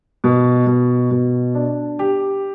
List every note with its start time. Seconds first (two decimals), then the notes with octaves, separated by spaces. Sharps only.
0.24 B2
0.67 B2
1.11 B2
1.55 D4
1.99 G4